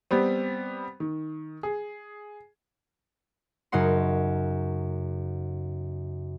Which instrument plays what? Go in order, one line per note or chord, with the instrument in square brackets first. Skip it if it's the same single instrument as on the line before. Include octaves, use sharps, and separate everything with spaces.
[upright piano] G3 B3 C4
D#3
G#4
[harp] F#2 C#3 D#4 F#5 C6